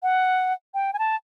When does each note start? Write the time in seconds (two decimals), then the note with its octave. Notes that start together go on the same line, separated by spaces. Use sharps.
0.03 F#5
0.74 G5
0.93 G#5
0.99 A5